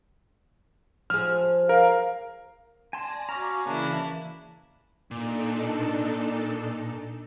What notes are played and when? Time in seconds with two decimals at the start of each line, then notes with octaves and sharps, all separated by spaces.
1.10 F3 G#4 F6
1.69 A#4 F5
2.93 D5 G#5 A5 C6 A#6
3.29 C#4 F#4 F5 A#5 D6
3.66 C#3 E3 A#3 D4 E4 F#6
5.11 A#2 D4 D#4 A4